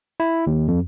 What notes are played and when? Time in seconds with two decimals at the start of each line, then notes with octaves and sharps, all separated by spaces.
0.20 E4
0.47 D#2
0.68 F2